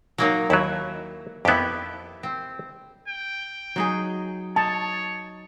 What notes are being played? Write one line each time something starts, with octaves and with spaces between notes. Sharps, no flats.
F#3 A#3 D#4
D#2 F#3 E4
F2 B3 E4 G4
C4
G5
F#3 D#4 G#4
D#4 C#5 A5